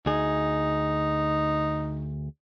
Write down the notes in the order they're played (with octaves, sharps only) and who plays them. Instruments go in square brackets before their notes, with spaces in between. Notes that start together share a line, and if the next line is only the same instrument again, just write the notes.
[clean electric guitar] D2 G#4 [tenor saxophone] D#4